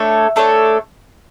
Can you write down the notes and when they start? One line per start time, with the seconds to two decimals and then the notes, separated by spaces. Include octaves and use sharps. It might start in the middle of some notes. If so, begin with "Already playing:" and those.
Already playing: A3 D4 A4 C#5
0.36 A3 D4 A4 C#5